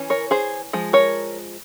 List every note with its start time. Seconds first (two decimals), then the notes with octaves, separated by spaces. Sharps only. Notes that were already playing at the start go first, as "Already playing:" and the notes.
Already playing: E3 C#4
0.10 A#4 C#5
0.31 G#4 C5
0.73 F3 G#3
0.93 A#4 C#5